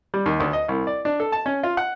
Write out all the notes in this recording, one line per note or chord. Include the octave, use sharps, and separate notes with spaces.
G3
D#2
D2
D#5
C2
D5
D4
A4
A5
C#4
F4
F#5